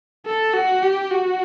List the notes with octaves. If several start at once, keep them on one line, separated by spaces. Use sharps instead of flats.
A4
F#4
G4
F#4